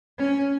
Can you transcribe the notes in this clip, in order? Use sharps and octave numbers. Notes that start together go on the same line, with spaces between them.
C#4